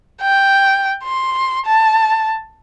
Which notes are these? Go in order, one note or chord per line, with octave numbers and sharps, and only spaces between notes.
G5
C6
A5